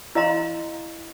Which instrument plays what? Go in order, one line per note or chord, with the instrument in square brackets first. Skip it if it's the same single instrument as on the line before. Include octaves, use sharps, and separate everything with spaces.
[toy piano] E4 D#5 F5 A#5 C6